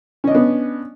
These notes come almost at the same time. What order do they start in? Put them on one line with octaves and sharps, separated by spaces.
C#4 D#5 D4 B3